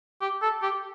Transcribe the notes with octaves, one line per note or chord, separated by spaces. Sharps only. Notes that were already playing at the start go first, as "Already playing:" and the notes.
G4
A4
G4